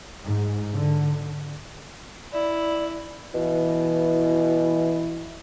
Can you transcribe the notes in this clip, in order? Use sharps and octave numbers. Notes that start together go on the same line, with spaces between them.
G#2
D3
E4 D5
B2 E3 E4